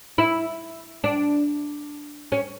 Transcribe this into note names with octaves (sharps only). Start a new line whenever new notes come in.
E4
D4
C#4